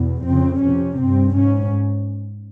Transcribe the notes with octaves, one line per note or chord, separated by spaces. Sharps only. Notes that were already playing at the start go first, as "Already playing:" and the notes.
Already playing: E2 B2
F2 C#3 C4
F2 C3 C#4
G2 C4
G#2 C#4